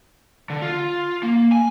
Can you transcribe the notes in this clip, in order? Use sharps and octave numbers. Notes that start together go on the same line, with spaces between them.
D3
F4
A#3
G#5